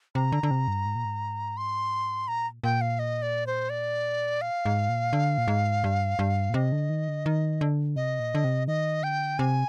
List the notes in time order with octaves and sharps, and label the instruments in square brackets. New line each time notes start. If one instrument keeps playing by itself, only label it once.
[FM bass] C3 [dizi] A#5
[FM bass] D3
D3
C3
G2
G#2
A#2
G#2
[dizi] C6
[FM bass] A#2 [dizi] A#5
[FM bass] A#2 [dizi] G5
[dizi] F5
D#5
D5
C5
D5
F5
[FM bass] G#2
A#2
D3
A#2
G#2
G2
G2
A#2
[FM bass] C3 [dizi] D#5
[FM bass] D3
D#3
D3
D#3
D3
[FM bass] C3 [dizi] D#5
[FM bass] A#2
D3
C3
[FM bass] D#3 [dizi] D#5
[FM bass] D3 [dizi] G5
[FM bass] C3 [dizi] G#5